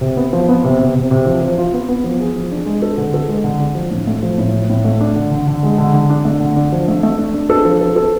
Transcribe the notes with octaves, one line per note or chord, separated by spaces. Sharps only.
C3
B3
F3
B3
C3
C3
C3
C3
F3
F3
F4
B3
B3
F3
G#4
F3
D4
G#3
A4
D3
A4
G#3
D3
D4
F3
A2
A3
F3
A2
F3
A2
A3
D4
D3
D3
D3
G#3
D3
D3
D4
A3
D3
D4
F3
A3
A3
D4
D4
A4
F3
A4
A4